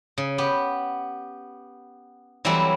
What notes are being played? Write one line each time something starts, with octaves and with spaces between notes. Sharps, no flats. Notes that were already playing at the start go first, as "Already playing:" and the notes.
C#3
B3 G4
E3 F#3 G3 A3 C4 E4